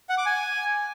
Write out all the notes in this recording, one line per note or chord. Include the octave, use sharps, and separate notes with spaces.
F#5
D6
G#5